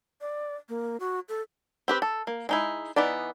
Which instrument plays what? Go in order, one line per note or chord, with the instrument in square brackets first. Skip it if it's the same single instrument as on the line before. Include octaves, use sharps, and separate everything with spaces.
[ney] D5
A#3
F#4
A4
[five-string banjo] C4 G4 B4
A4
A#3
G#3 D#4 E4
E3 B3 D#4 D5